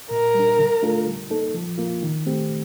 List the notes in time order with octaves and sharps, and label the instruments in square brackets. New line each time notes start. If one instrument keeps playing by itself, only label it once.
[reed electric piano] A#2 [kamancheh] A#4
[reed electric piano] G3 D4
D3
A3 D4 F4 A4
G3
A#3 D#4 A4
F3
A#3 F4
D#3
A3 C4 G4